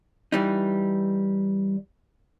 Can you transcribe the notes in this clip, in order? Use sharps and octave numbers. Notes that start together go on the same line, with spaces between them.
E3 G3 D#4